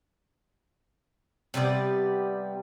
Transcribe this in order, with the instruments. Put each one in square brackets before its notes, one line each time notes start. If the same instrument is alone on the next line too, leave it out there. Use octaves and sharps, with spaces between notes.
[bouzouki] C3 G3 B3 D5